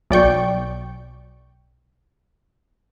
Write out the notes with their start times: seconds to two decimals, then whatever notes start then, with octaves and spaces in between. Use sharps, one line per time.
0.10 B1 D5 G5 C#6